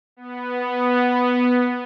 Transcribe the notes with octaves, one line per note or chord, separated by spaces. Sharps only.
B3